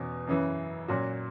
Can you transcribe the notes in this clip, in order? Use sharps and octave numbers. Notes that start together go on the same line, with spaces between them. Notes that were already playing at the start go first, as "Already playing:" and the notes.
Already playing: E2 B2 C#4
F#2 C#3 E3
A#2 F#3 C#4 F#4